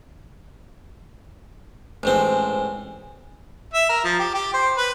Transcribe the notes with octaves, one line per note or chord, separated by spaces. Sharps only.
A1 G#2 C4
E5
A#4
F3
G4
G4
C5
B4